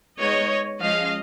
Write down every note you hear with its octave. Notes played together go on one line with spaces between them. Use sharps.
G#3 B3 D#4 C#5 D#5
F3 G#3 C#4 D#5 F5